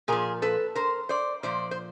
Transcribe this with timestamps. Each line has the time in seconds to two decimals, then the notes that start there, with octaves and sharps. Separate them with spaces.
0.08 A#2 F3 G#4 A#4
0.42 A4 B4
0.75 A#4 C5
1.09 C5 D5
1.43 A#2 F3 C5 D5
1.71 C5